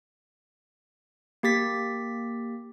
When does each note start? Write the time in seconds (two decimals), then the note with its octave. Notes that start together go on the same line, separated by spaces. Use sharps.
1.43 A#3 G4 A6 B6